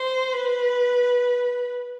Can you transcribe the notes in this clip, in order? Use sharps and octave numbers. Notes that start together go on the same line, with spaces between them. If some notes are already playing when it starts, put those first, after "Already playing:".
Already playing: C5
B4